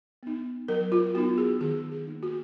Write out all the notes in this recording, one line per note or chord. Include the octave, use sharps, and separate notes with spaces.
B3 D#4
F#3 A#4
F4
B3 D#4 F#4
G#4
D#3 G#4
G#4
A#3 D#4
F#4